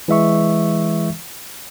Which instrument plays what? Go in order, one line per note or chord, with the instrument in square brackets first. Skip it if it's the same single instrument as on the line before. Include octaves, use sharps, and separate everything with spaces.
[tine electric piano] E3 G#3 E5 C#6